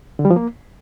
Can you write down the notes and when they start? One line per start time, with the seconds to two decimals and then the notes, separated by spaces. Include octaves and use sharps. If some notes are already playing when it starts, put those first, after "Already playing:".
0.19 D3
0.25 G3
0.31 F3
0.36 A#3